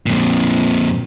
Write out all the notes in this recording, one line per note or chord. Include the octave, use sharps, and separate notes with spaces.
F2 A#2